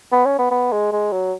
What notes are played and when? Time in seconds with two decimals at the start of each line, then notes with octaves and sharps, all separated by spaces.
0.12 B3
0.26 C#4
0.39 B3
0.51 B3
0.72 G#3
0.92 G#3
1.12 F#3